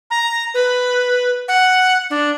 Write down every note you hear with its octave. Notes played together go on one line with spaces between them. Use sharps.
A#5
B4
F#5
D4